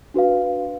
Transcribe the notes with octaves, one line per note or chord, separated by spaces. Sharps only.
D4 F#4 B4 F5